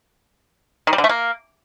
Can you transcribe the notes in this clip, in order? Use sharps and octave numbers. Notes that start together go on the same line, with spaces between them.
D#3
G3
D3
A3
A#3